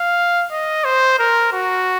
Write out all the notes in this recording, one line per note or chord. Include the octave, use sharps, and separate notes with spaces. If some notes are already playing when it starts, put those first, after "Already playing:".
Already playing: F5
D#5
C5
A#4
F#4